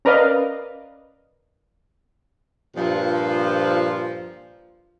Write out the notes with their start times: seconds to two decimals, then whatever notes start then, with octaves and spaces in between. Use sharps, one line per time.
0.05 C#4 A#4 B4 D5 D#5 F5
2.76 G2 A#2 F3